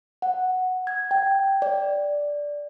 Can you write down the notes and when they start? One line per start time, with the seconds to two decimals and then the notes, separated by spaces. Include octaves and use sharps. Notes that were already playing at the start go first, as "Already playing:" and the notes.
0.22 F#5
0.87 G#6
1.11 G5
1.62 D5